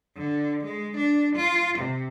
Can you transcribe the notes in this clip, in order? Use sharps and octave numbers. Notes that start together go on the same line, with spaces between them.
D3
G#3
D4
F4
C3